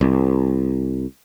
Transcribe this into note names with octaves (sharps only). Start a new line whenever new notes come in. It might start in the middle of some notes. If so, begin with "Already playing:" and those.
C2